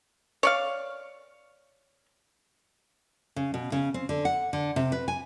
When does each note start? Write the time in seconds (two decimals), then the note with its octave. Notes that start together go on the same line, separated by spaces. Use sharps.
0.43 C#5 D5 F5
3.36 C#3
3.54 B2
3.72 C#3
3.94 C4
4.09 D3
4.25 F#5
4.53 D3
4.76 C3
4.92 B4
5.08 G#5